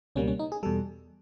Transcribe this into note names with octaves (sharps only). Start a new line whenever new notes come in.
C#2 B2 G3 A#3 C#4
C#4
D#4
G#4
E2 B2 G3 A4